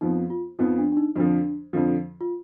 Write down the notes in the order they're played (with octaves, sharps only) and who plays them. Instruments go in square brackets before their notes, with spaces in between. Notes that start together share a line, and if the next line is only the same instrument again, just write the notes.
[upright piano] F2 F3 B3 [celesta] D#4
[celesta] F4
[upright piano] F2 F3 B3 [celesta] D#4
[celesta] D4
D4
D#4
[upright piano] F2 D3 F3 [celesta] D4
[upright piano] F2 D3 F3
[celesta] F4